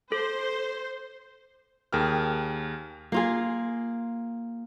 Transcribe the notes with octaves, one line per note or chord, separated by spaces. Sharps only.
A4 C5
D#2 G#4 A#4 G5 F6
A#3 F4 G#4